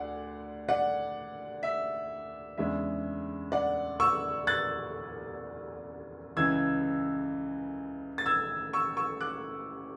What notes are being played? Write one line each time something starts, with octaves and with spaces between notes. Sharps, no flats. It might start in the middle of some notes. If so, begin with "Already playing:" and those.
Already playing: D2 D3 D4 D5 F#5
D5 F#5
E5
E2 C#3 G#3 D4 E5
D5 F#5
C#6 E6
F#6 A6
C#2 C#3 E3 E6 G#6
A6
E6 G#6
C#6 E6
C#6 E6
D6 F#6